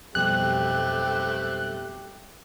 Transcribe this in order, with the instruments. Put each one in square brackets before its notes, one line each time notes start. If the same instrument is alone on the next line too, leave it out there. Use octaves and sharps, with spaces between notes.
[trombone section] B1 G4 [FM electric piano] F2 B2 G3 [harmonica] A3 C4 [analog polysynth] F#6